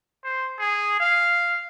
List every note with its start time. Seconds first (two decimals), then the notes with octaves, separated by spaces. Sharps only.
0.24 C5
0.59 G#4
1.00 F5